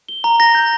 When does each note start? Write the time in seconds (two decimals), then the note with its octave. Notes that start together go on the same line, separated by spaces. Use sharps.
0.09 G7
0.24 A#5
0.40 A#6
0.55 G6